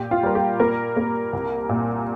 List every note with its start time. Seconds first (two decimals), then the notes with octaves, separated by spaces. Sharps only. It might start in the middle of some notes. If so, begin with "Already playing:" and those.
Already playing: A#2 G4
0.11 F4
0.23 G3 A#4
0.35 G4
0.60 A#3 A#4
0.97 A#3
1.33 C2
1.69 A#2